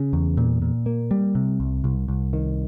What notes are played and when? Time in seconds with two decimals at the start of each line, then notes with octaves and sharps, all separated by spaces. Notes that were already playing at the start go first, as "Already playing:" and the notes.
Already playing: C#3
0.13 E2
0.37 A#2
0.62 A#2
0.86 A#3
1.11 G3
1.35 C3
1.60 C2
1.84 C2
2.08 C2
2.33 D#3